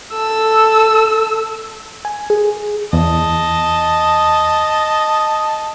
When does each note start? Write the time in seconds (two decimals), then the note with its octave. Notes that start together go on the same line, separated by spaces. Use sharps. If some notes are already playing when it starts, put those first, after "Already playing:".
0.13 A4 E6
2.05 G#5
2.30 G#4
2.93 E2 D#5 A5